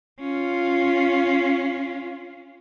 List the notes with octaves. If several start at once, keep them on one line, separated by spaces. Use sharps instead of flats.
C#4 F4